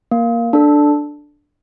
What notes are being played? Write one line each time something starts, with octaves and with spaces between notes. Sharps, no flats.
A#3
D4 A4